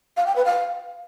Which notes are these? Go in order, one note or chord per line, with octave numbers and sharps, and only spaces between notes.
F5
G5
B4
F5